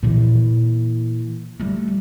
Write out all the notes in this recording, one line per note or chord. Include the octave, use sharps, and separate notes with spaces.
A#2 E3
G3 A3